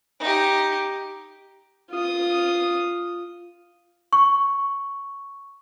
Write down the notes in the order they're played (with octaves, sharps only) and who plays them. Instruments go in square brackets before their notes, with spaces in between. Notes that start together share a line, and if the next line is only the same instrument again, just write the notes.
[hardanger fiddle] D#4 G4
[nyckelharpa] F4 D#6
[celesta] C#6